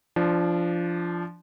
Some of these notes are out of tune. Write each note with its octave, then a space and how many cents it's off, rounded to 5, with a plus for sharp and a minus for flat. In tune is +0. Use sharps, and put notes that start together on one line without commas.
F3 -15 D4 +0